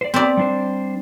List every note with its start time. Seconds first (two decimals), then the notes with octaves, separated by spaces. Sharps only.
0.01 C5 D5
0.14 B3 C4 D5
0.37 G3 D4 C5